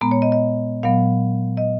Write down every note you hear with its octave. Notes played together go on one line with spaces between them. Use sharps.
A#2 G#3 B3 A#5
C#5
D#5
D#5
A#2 F#3 B3 F5
D#5